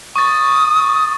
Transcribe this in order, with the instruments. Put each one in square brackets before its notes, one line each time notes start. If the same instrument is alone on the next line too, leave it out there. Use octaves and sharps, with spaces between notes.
[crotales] C#6 A6 [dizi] D#6